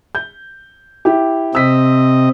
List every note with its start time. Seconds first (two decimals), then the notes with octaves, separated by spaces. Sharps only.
0.15 G6
1.05 E4 G4
1.55 C3 C4 D#5 E6 B6